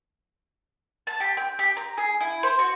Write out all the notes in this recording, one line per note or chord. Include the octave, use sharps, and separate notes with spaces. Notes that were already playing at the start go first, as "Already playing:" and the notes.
A5
G4
G5
G4
A#5
G#4
E4
C5
F#4